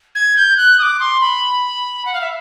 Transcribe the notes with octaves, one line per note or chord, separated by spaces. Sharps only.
G#6
G6
F#6
D#6
D6
C6
B5
F#5
F5
E5